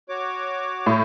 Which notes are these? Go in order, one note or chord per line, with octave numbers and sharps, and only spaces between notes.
F#4 C#5 D6
A2